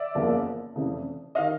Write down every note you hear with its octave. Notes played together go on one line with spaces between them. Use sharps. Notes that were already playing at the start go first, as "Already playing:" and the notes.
Already playing: D5 E5
F#1 E2 C#3 F3 A#3
F1 F2 C#3 E3
D#3 D#5 F5